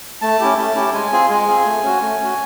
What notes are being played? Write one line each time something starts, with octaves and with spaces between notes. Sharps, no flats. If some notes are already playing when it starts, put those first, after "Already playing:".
A3 A5
C#4 E4 G4
A3
C#4 E4 G4
G#3 G#5
C4 F4 G#4
G#3 G#5
C4 F4 G#4
A3
C#4 F#4
A3
C#4 F#4